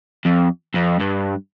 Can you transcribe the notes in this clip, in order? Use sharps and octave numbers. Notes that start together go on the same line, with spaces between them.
F2
F2
G2